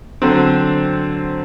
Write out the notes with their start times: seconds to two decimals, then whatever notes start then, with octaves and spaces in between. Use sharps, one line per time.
0.22 D3 F#3 C4